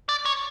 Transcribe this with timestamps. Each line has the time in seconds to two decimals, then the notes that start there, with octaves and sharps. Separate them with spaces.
0.09 D5
0.26 C#5